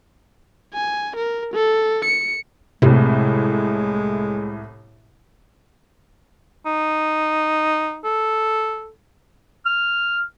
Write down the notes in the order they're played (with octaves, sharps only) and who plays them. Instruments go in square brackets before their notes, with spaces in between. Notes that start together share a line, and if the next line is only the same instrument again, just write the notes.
[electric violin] G#5
A#4
A4
C#7
[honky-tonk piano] C2 A2 [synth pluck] C3 [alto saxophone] G#3
[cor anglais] D#4
A4
[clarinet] F6